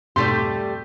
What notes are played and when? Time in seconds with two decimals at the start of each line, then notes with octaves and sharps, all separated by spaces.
0.16 F2 G#2 B2 G3 A3 G4 C6